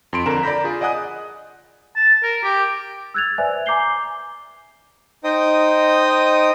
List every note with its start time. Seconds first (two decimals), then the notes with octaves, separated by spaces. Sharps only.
0.13 F2 C6 D7
0.26 F2 D3 A#4 A#5 E7
0.43 D5 A#5 B5 G6 A#6 B6
0.64 F4 G#4
0.81 D5 D#5 F#5 G#5 D#6 F#6
1.96 A5
2.23 A#4
2.44 G4
3.14 E6 F#6 G#6 A6 F7
3.38 B4 C5 D5 E5 G#5
3.66 G#5 A#5 D6 G6 C7 G7
5.24 D#4 C5 D#5 G5 D#6